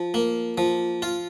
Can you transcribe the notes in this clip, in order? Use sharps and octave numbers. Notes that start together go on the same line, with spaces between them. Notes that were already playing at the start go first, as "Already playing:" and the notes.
Already playing: F3
A#3
F3
F4